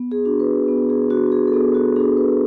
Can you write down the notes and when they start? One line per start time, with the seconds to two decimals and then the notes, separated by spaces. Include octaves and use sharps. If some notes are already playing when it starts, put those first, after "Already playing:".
Already playing: B3
0.12 G#4
0.25 D4 F#4
0.40 B4
0.68 B3
0.90 G#4
1.10 D4 F#4
1.26 F#4
1.32 G#4
1.47 A4
1.53 B3 G#4
1.74 F#4
1.96 D4 F#4 G#4
2.17 B4